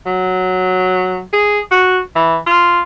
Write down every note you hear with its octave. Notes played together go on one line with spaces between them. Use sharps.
F#3
G#4
F#4
E3
F4